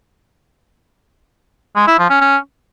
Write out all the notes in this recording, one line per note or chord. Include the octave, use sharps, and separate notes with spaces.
G#3
E4
F3
C#4
C#4